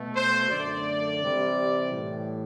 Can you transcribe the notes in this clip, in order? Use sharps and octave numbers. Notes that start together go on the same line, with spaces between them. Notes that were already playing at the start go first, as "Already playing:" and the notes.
Already playing: B2 A3
C5
F#2 D3 A3 D5
C3 E3 G3
A2 E3 G3